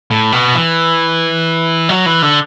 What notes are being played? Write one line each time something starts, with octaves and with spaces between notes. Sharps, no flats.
A2
B2
E3
F#3
E3
D3